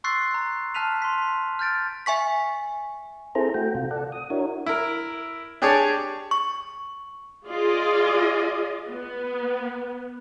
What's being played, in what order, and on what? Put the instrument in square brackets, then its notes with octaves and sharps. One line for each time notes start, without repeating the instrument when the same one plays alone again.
[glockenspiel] C6 C#6 E6 F#6 A6 C7
A#5
A5 F6 F#6 B6 D#7 F7
C6 B6
F6 G6 A6 D7
[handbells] E5 G#5 C#6 B6
[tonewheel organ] C4 E4 G#4 A4 C5 A#5
A3 F#4 G5
C3 F4
A4 D5 F#5
D#6
D4 E4 F#4 A#4 C#5
[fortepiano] E4 A#4
D4 G4 G#4 C#5 D5 A5
[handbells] C#6
[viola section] F4 G#4 D5 D#5
B3